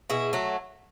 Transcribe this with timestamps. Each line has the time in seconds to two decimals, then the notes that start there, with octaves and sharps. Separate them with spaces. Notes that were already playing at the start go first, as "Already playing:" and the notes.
0.10 B2 E4 G#4
0.33 F#3 A3